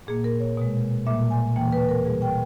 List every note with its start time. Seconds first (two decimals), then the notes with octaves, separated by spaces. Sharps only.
0.07 A#2 A#3 G#4
0.24 A#4
0.40 C#5
0.57 B2 G#3
1.06 A#2 G3 A#3 E5
1.30 G#5
1.56 D#2 C#3 E3 A#3 G5
1.73 B4
1.89 A#4
2.05 B2 G3 A#3 G#4
2.22 G5